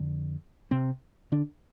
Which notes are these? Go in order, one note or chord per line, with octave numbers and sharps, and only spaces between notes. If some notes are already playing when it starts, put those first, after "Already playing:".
Already playing: F2 D3
C3 C4
D3 D4